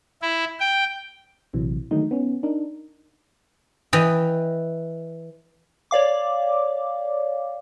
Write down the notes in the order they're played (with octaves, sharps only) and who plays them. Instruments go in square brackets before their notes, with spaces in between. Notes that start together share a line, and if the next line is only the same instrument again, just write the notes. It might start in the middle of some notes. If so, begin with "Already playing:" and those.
[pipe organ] E4
G5
[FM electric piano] A#1 C3 E3 F#3
D3 D#3 F#3 G#3 A3 D#4
B3 C#4
D4 D#4 A#4
[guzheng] E3 D#5 G5
[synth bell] C#5 D5 F5 D6